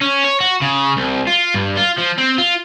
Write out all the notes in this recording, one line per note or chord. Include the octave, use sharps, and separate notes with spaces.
C#4
C#5
F#4
C#3
C2
F4
G2
F4
F3
C4
F4